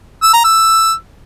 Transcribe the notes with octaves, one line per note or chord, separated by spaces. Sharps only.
E6
A#5
E6